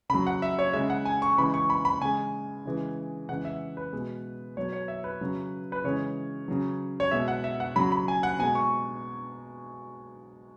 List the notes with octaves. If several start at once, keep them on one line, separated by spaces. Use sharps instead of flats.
C#3 F#3 B5
F#5
E5
C#5
C#3 G#3 E5
F#5
G#5
C#6
C#3 E3 G#3 B5
C#6
B5
B5
C#3 G#3 G#5
C#3 E3 G#3
C#3 E3 G#3 F#5
E5
B4
B2 G#3
B2 F#3 C#5
C#5
E5
B4
C#3 F#3
B4
C#3 E3 G#3 C#5
C#3 F#3
C#5
B2 G#3 E5
F#5
E5
F#5
C#3 F#3 B5
B5
G#5
F#5
B2 G#3 G#5
C#6